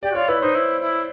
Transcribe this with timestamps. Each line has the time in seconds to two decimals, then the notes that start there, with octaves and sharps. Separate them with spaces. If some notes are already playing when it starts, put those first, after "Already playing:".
0.02 G4 D5
0.11 F#4
0.15 F4 C#5
0.28 E4 B4
0.42 D#4 C5
0.55 E4
0.81 E4